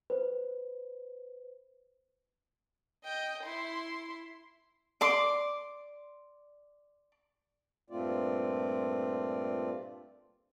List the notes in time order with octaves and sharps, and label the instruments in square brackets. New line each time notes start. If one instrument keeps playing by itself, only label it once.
[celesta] B4 C5
[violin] D#5 G5
E4 C6
[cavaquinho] D5 C6 D6
[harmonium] G2 A#2 A3 C4 F4 D5